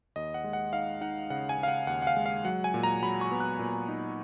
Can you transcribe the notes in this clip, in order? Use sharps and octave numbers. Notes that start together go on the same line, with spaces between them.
D#2 D#5
F#5
G#3
F#5
D#4 F5
D#4 F#5
C#3 F#5
G#5
C#3
F5
F#5
D#2 F#5
F#5
F5
G#3
F5
F#3 F#5
G#5
A#2
A#5
F#3 B5
C#6
B3
F#6
A#2
D#4